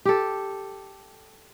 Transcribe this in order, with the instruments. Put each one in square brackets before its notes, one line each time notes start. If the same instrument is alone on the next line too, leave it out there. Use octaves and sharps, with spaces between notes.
[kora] G4 A4